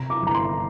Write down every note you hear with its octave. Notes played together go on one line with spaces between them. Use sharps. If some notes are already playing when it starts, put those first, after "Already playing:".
Already playing: C3 A#5
D6
G1 A#5
C6